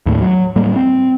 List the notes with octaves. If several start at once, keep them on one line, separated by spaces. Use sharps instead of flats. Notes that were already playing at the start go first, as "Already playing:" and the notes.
D#2 A2
F#3
A2 G3 A#3
C4